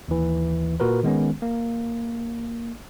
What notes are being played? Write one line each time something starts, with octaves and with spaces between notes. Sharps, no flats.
D#2 E3
A#2 F#4 A#4 B4
D#3 G#3 B3 C#4
A#3